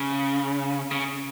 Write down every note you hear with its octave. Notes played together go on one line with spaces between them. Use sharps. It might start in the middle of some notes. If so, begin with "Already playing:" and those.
Already playing: C#3
C#3